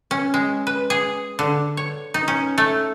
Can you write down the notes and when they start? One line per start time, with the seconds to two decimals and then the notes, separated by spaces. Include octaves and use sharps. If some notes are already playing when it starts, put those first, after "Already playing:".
0.11 C#4
0.34 G#3
0.67 B4
0.90 G#4
1.39 D3
1.77 C#5
2.14 D#4
2.28 C#4
2.58 A3